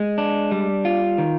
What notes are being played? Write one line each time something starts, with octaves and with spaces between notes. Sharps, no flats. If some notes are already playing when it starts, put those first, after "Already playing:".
Already playing: G#3
D4
G3
F4
D#3